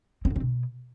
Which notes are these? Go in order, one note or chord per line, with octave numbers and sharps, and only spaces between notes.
C4
D3
C4
B2